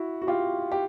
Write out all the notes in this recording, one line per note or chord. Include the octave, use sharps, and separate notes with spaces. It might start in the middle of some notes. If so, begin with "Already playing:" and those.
Already playing: E4 F#4
F#4
F4 G4
G4